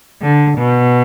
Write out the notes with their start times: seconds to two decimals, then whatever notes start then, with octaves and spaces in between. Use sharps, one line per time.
0.22 D3
0.57 B2